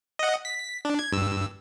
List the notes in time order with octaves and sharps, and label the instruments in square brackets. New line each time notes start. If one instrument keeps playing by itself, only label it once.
[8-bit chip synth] D#5 F#5
B6
D4
G#6
G2 E6